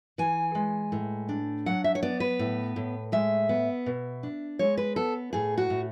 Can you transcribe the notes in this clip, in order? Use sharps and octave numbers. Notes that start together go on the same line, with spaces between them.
E3 G#5
G#3
A2
D4
F#3 F#5
E5
C#5
B3 D5
B4
A2
A2
G#3 E5
B3
B2
D4
G#3 C#5
B4
B3 A4
A2 G#4
F#4
A2